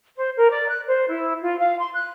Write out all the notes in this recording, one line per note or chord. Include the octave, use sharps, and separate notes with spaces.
C5
A#4
D5
F#6
C5
E4
F4
F5
C6
F#6